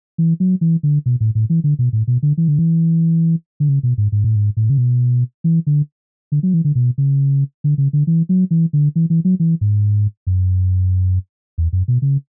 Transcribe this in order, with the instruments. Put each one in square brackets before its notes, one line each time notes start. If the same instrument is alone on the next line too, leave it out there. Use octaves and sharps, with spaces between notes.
[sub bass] E3
F#3
E3
D3
B2
A2
A2
E3
D3
B2
A2
B2
D3
E3
D3
E3
D3
C#3
B2
G#2
G#2
A2
G#2
A2
C#3
B2
E3
D3
D3
F#3
E3
D3
B2
C#3
D3
C#3
D3
E3
F#3
E3
D3
E3
E3
F#3
E3
G#2
F#2
E2
F#2
B2
C#3